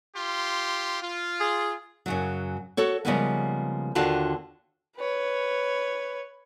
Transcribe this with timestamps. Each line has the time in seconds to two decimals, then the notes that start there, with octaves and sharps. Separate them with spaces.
0.15 F4 G4 C6
1.01 F4
1.40 G#4
2.06 F#2 C#3 F#3
2.77 F#4 A4 C#5
3.05 C#3 F3 G3 G#3 A#3 B3
3.95 D#2 D3 D4 F4 F#4 A5
4.96 B4 C#5